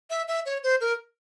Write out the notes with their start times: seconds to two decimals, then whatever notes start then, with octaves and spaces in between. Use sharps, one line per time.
0.10 E5
0.28 E5
0.46 C#5
0.63 C5
0.81 A#4